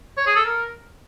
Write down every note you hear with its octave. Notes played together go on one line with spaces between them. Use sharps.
C#5
G#4
A4
A#4